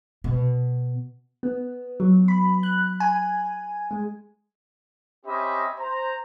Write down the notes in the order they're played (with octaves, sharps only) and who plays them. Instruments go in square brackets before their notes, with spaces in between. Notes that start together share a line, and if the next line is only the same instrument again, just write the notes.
[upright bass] B2
[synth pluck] B3
F#3
B5
F#6
G#5
G#3
[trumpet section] C4 C#4 G4 D#5 E5 B5
C5 A#5